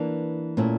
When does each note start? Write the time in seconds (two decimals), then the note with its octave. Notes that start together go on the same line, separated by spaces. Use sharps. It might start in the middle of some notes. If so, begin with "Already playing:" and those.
Already playing: E3 A#3 D4
0.57 A#2 A3 C#4 E4